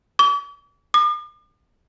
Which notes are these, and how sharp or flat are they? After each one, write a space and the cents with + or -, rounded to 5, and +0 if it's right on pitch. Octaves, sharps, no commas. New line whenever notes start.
D6 -45
D6 +45